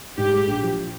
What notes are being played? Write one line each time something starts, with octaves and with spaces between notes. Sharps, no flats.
G#2 G4
G#3
A#1
F3